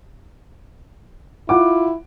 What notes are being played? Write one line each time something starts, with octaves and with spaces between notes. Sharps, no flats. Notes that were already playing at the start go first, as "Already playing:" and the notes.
E4 F4 F#5 D6